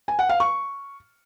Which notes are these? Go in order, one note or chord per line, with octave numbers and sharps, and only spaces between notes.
G#5
F#5
F5
C#6